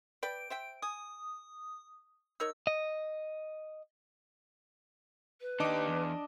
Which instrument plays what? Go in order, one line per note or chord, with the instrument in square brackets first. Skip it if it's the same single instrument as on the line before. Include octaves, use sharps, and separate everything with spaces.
[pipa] B4 D5 G5 [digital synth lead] D7
[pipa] C5 E5 G5
[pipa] G#5 [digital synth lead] D#6
[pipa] D#4 A#4 C#5 [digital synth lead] E6
[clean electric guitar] D#5
[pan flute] B4
[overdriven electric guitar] D#3 G4 [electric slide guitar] D4 [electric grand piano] D#5 D6
[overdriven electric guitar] E2